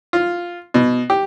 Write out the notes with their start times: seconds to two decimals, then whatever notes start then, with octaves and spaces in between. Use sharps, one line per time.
0.13 F4
0.74 B2
1.10 G4